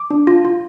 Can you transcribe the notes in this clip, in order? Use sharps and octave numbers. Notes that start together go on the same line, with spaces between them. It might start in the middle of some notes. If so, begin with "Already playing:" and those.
Already playing: D6
D4
F4
F4